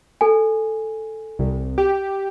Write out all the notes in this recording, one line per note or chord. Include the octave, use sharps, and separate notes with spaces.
A4 G#5
C2
G4